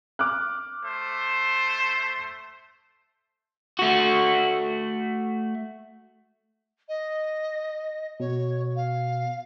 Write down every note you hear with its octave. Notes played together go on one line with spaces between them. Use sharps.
D6 F6 F#6
A3 C5
A3 F#4
D#5
B2 C#5
F5